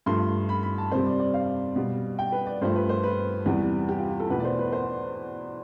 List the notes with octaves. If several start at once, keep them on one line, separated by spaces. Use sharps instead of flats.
G2 F3 A3 C6
B5
B5
A5
F2 C3 G3 C5
D5
D5
F5
B2 G3
G5
B4
D5
G2 F3 A3 C5
B4
C5
B4
E2 C3 E3 G3
G4
F4
F4
A4
E2 B2 A3 B4
D5
C5
B4
C5
D5